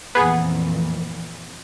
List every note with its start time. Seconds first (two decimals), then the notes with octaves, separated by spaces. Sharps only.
0.15 F2 A#2 E3 B3 G#4